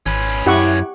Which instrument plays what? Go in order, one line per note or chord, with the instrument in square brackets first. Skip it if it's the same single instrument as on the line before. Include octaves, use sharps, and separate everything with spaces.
[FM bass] G#1 [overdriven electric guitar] C#4 B4
[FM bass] F#2 [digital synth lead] E4 [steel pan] G4 F#5 C#6